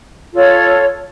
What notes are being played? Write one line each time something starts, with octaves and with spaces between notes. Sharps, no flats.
F4 A4 C#5